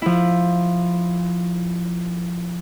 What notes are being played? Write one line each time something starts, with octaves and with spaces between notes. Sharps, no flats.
F3 E4